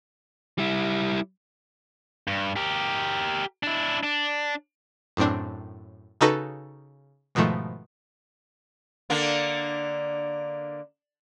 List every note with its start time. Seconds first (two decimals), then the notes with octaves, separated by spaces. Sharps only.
0.58 G3 E4
2.28 G2
2.56 G4 A#4
3.63 D4 E4
4.03 D4
5.17 F#2 A2 C4 D4
6.21 C#3 D#4 F#4 A4 B4 A#6
7.35 G#2 B2 D#3 F3 A3
9.10 D3 A#3 D4